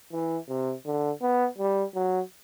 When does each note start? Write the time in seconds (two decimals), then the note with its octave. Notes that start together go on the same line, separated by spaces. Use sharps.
0.12 E3
0.48 C3
0.86 D3
1.22 B3
1.58 G3
1.95 F#3